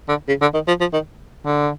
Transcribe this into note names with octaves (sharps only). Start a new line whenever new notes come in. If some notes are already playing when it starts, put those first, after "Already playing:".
D3
C#3
D3
D#3
F3
F3
D#3
D3